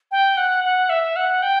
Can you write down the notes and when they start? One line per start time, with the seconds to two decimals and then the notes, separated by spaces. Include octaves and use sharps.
0.11 G5
0.37 F#5
0.64 F#5
0.90 E5
1.16 F#5
1.42 G5